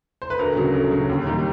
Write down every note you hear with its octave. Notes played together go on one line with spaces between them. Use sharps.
C5
B4
D2 A#4
C#3 F#3
D2
C#3 F#3
D#2
D#3 G3 A#3